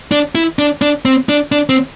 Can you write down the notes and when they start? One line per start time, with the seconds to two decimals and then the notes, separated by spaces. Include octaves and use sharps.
0.12 D4
0.35 E4
0.59 D4
0.82 D4
1.05 C4
1.29 D4
1.52 D4
1.69 C4